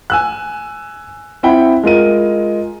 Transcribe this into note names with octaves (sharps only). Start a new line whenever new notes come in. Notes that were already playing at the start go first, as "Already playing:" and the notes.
G#5 E6 F#6
C4 E4 E5 F#5 G5 B5
G#3 F4 A#4 D#7